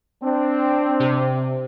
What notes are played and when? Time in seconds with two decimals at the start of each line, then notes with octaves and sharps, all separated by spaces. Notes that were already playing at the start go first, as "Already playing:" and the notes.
0.23 C4 D4
1.00 C3